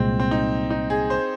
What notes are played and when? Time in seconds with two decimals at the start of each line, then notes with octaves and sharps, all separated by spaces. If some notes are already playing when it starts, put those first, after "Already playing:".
Already playing: C2 A#2 G#3 C4
0.19 C4
0.31 D#4
0.70 D#4
0.90 G#4
1.10 C5